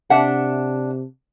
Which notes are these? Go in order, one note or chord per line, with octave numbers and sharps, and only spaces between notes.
C3 D4 E5 F#5